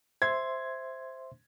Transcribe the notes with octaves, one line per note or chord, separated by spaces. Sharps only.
C5 E5 C6 G#6